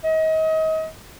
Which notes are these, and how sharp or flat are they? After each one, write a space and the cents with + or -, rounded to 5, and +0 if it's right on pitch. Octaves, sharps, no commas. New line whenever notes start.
D#5 +35